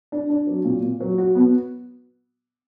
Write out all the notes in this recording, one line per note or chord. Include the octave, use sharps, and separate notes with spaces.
D4
D4
F#3
A#2
A#2
F#3
F#4
B3